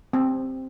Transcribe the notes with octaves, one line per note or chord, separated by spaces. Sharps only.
C4